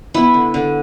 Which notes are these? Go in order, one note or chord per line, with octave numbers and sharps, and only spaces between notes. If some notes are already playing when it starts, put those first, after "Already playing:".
B3 E4
D3
D3